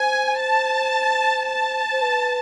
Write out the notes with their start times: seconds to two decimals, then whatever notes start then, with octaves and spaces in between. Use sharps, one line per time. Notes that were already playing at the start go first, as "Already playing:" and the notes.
Already playing: C5 G#5
0.41 A5
1.48 A5
1.91 C5
2.02 B4